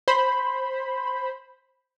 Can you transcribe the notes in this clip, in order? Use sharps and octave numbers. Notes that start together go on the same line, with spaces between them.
C5 B5